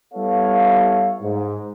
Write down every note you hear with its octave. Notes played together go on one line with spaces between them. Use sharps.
G3 B3 E4 A4 C#5 F5
G#2